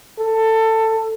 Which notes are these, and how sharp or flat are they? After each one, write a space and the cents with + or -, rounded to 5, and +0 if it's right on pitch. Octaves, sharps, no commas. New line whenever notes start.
A4 +15